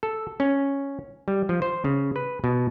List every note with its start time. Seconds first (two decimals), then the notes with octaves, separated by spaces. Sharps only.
0.03 A4
0.40 C#4
1.28 G3
1.49 F3
1.62 C5
1.84 C#3
2.16 B4
2.44 B2